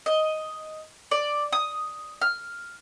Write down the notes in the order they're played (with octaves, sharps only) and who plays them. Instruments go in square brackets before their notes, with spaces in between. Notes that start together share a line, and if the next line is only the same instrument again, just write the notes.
[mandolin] D#5
D5
D#6
F6